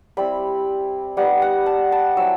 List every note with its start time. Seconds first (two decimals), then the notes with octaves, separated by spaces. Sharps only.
0.17 G3 C4 E4 B5
1.17 G3 B3 D#4 F#5
1.42 F#5
1.66 A5
1.92 A5
2.17 F#3 C4 E4 E6